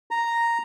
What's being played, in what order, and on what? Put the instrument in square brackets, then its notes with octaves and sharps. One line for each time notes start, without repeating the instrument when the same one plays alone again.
[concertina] A#5